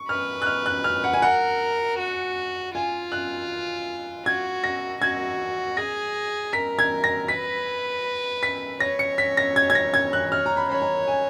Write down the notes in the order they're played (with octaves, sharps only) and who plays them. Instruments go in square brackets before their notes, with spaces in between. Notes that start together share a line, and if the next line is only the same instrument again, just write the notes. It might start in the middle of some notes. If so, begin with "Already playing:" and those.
Already playing: [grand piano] C#6
[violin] B4 [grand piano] F6
[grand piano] F#6
F6
F#6
F6
F#5
G#5
[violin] A#4 [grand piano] F#5
[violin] F#4
[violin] F4 [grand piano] G#5
[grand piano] F#6
[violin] F#4 [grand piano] G#6
[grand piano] A#6
[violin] F#4 [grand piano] G#6
[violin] G#4 [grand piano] A#6
[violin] A#4 [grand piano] B6
[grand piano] G#6
A#6
[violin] B4 [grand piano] B6
[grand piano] B6
[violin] C#5 [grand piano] A#6
[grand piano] C#7
B6
A#6
G#6
G#6
A#6
G#6
F#6
[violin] C#5 [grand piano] F6
[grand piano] A#5
B5
[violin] C#5 [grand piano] B5
[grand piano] A#5
G#5